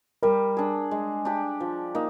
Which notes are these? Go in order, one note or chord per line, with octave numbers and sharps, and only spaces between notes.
G3 A#4
D4 G#4
G#3
D4 G4
F3
A#3 D#4